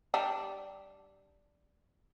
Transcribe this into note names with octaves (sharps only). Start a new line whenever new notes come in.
G3 D4